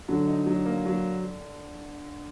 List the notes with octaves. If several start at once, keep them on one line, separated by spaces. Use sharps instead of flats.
D3 F#3
D#4
F#3
A#3
F#3